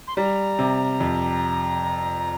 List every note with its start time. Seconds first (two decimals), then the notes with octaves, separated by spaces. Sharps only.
0.07 C6
0.16 G3 A#5
0.59 C3
1.00 F2